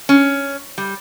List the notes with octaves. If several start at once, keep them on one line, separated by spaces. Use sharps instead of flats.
C#4
G3